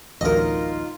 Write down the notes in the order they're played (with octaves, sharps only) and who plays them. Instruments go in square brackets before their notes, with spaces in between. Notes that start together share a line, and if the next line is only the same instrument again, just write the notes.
[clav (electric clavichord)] A1 D2 F#3 [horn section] D#4 F4 [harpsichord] A#4 D#5